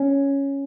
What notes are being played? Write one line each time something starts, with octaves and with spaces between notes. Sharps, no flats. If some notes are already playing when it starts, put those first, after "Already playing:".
Already playing: C#4